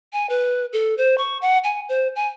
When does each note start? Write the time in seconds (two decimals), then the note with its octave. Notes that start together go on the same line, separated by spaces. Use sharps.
0.13 G#5
0.30 B4
0.73 A4
0.98 C5
1.18 C#6
1.42 F#5
1.64 G#5
1.89 C5
2.16 G#5